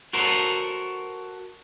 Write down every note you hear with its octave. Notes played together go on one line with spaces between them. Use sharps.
F#4 A4 A#4 C5